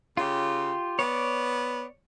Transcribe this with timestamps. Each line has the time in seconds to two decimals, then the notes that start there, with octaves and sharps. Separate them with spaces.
0.17 C#3 F4 G4
0.99 B3 C#5 D5